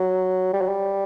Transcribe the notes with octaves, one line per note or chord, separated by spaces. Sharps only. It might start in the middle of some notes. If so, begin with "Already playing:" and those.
Already playing: F#3
G3
F#3
G3